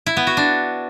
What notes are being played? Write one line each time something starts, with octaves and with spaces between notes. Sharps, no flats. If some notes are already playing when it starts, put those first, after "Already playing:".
E4
B3
F#4
D4